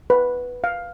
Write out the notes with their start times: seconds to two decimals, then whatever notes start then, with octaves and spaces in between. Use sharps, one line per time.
0.10 B4
0.64 F5